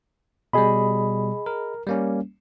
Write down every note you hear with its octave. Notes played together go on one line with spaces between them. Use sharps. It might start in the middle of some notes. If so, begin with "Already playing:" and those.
B2 G3 G#4 D#5 B5
A#4
G3 A#3 C#4